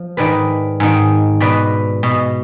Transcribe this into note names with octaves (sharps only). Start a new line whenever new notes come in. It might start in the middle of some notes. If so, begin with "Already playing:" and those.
Already playing: F3
G#2 D#3 B4 D5
G#2 D#3
B2 B4 D5
B2